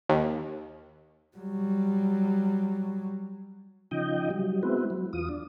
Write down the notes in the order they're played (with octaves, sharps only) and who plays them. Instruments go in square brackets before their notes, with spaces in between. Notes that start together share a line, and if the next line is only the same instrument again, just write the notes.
[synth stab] D#2
[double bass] F#3 G3
[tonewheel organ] C#3 F3 D#4 D#5 G5
F#3 G3
G#3 B3 C4 E4 F#4
F#3
E2 F4 D#6
D4